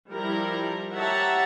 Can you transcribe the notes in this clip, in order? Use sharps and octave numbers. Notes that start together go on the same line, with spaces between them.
F3 G3 E4 A#4
G4 C#5 E5 F#5 A5 A#5